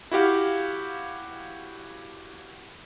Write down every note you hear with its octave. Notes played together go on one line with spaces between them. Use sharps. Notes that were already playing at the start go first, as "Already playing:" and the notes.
E4 F#4 G4 F5